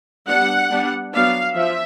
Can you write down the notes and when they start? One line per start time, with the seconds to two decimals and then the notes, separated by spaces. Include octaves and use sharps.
0.27 G3 B3 D4 F#5
0.70 G3 B3 D4
1.13 F#3 B3 D4 F5
1.55 F3 E5